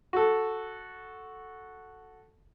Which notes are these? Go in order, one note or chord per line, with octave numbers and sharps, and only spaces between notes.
F#4 A4